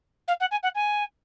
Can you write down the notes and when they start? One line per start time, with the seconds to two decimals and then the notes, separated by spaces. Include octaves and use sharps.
0.28 F5
0.40 F#5
0.51 G#5
0.63 F#5
0.75 G#5